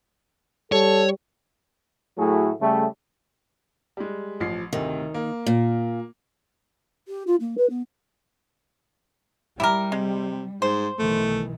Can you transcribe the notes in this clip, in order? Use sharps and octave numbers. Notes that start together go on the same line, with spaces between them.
G3 A4 C#5
A2 F#3 A3 E4 F#4 G#4
C#3 G3 A3
G3 G#3
A1 F3 C7
D2 A2 C3 D#3
A#3
A#2
G4
F4
A#3
B4
B3
G3 E4 G4 A#4
C3 G#3
G#2 C5
B1 D#3 E3 A3